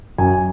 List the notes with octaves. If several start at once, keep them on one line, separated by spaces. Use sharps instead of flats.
F#2 G#5